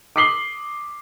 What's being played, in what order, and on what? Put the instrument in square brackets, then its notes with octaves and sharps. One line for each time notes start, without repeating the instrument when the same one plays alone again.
[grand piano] D6 D#6 B6 C7 F#7 G7